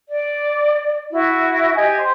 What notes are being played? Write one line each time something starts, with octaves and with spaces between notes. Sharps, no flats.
D5
E4 F#4
G4 D#5 G#5 G#6
C5